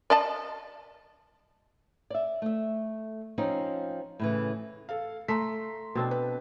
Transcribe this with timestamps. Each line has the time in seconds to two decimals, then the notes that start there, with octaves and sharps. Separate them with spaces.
0.10 D5 D#5 A5
2.10 D5 E5
2.42 A3 E5
3.38 F3 C4 C#4 D#4
4.20 A2 C#3 E3
4.89 A4 F5
5.28 A3 A#5 C6 B6
5.95 B2 C4 D4
6.11 B4